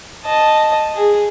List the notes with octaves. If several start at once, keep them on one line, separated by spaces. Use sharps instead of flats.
D#5 A5
G#4